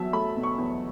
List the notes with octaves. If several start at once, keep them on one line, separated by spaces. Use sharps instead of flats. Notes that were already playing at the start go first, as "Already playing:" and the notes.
Already playing: E2 F#3 E5 A5
A3 B5
B2
C#6
E2